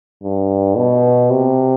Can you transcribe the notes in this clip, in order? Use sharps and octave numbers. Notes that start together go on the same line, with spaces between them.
G2
B2
C3